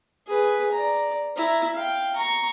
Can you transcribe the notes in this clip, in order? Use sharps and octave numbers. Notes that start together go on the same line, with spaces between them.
G#4 B4
D5 A#5
E4 A#5
F5 G5
A#5 C#6